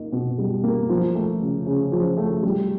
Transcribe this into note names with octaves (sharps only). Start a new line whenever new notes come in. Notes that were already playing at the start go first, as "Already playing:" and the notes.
Already playing: A#3 D#4
B2
G3
A#3
F3
A3
C#3
C#3
F3
A3
G3